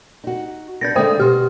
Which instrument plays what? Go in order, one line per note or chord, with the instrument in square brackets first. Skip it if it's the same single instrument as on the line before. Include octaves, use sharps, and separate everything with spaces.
[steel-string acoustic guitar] D#4 F#4
[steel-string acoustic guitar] B3 D4 B4 [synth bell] G6 A6 A#6
[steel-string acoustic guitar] D3 G#3 A#3 [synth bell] C5 G5 D#6
[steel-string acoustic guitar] B2 F#4 C5 [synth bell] G4 F6